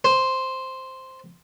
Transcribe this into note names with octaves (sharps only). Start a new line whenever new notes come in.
C5